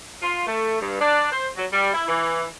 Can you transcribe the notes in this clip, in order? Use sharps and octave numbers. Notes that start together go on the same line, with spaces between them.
F4
A3
G2
D4
C5
F#3
G3
E4
E3